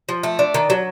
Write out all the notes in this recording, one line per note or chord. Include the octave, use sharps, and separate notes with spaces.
F3
A3
D4
D#3
F#3